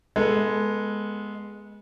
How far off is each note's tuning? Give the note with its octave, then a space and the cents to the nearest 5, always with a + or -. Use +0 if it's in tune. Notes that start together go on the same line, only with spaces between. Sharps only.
G#3 +0 B3 -20 A4 +0